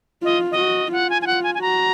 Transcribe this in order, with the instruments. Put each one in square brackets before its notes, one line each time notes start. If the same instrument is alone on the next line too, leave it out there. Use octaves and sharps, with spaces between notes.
[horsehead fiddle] F4 [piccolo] D#5
[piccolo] D#5
[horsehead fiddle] F#4
[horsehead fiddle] F4 [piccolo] F#5
[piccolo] G#5
G#5
[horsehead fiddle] F4 [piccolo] F#5
[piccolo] G#5
G#5
[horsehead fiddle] F#4 [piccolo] A#5